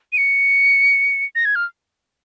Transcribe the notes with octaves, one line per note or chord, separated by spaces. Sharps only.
D#7
C#7
A#6
G#6
F6